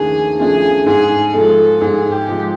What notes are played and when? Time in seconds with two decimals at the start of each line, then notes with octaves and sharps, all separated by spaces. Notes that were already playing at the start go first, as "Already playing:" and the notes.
Already playing: D#2 C#3 F3 A3 D4 G#4
0.39 C#3 F3 A3 D4 G#4
0.86 G#2 G#4
1.33 F3 G#3 A4
1.81 G#2 G#4
2.12 G4
2.28 F3 G#3